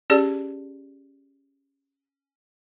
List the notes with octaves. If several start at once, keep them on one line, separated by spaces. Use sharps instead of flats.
C#4 G4 G#4 D5